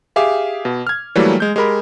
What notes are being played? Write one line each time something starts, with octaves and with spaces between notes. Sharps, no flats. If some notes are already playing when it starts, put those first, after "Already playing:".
G4 G#4 E5 F5 D6
B2
F6 G#6
E3 F#3 G3 A3 A#3
G#3 G6
G#3 G4 A#4 B5